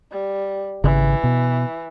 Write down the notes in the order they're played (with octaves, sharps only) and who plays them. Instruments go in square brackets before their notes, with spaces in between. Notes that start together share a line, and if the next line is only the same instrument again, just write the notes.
[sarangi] G3
[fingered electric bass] G#1 C#3 [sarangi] E3
[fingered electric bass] B2